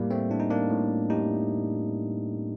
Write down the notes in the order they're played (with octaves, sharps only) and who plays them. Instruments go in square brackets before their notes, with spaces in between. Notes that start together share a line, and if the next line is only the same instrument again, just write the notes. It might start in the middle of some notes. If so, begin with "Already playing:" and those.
Already playing: [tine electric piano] A2 G3 A#3
A3 C4
A2 D4
D#4
A#3 D4
A2
A2 D#4 G4